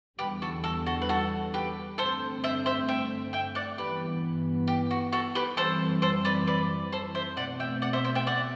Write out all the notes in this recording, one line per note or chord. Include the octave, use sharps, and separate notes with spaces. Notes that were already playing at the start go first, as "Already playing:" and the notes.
E2 D3 G3 G4 B4
F#4 A4
F#4 A4
F#4 A4
B4
F#4 A4
G4 B4
G2 D3 A3 C4 A4 C5
C5 E5
C5 E5
E5 G5
E5 G5
D5 F#5
G2 E3 B3 G4 B4
G4
F#4
F#4 A4
G4 B4
F#2 E3 G3 C4 A4 C5
A4 C5
B4 D5
B4 D5
A4 C5
C5 E5
B2 A3 C4 D5 F#5
E5 G5
D5 F#5
C5 E5
C5 E5
E5 G5
D5 F#5